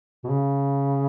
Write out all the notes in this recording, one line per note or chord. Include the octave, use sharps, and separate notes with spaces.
B2
C#3